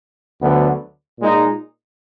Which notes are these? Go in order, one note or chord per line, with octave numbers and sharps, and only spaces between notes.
D2 D3 F#3 B3
A#2 G#3 D#4